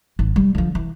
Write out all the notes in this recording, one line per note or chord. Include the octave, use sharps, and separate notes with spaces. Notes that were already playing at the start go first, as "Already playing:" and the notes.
G#1
G3
D3 F3
E3